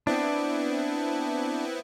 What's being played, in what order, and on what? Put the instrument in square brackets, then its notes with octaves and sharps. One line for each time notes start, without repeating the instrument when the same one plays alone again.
[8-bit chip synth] B3 C4 E4 [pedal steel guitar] D4